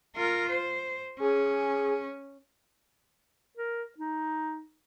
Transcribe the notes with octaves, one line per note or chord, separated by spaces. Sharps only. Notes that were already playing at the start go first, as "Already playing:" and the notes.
F4 A#4
C5
C#4 G#4
A#4
D#4